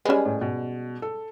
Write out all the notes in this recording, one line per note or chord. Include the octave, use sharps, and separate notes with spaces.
G3 G#3 C#4 B4
A2
B2
A4